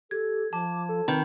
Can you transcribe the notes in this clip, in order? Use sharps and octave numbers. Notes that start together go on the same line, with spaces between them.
G4 A4 G#6
F3 A5 D6
A4
D#3 C4 B4 B5 G6